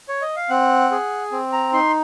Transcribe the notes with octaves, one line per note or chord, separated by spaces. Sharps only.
C#5
D#5
F5
C4 F#5
G#4
C4
A#5
D#4 C6